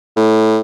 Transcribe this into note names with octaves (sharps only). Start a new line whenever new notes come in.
A2